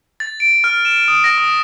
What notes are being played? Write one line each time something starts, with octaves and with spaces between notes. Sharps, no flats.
A6
D7
F6
E7
D#6
A#6
D#6